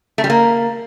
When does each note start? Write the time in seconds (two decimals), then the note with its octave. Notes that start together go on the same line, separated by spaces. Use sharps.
0.18 A3
0.24 G3
0.30 A#3